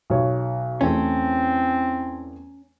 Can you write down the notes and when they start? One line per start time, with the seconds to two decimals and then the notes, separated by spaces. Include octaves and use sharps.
0.10 B1 C#5
0.81 E2 A3 C4 C#4